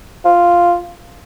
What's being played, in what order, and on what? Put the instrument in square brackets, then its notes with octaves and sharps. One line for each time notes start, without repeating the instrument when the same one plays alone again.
[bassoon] F4